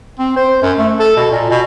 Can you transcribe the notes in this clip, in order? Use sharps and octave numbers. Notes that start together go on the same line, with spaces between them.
C4
C5
F#2
A3
A4
B2
A#2
B2